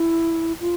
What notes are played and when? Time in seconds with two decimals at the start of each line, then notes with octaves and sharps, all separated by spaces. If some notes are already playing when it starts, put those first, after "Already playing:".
Already playing: E4
0.60 F4